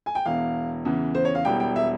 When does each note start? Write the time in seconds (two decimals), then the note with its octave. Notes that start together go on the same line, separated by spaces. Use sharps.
0.06 G#5
0.15 G5
0.26 E1 E2 E3 F5
0.85 E2 C#3 E3
1.15 C5
1.25 C#5
1.35 F5
1.45 E1 E2 E3 G3 G5
1.60 G5
1.76 E5